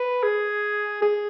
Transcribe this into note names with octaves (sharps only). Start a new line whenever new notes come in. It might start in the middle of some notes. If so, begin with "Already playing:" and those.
Already playing: B4
G#4
G#4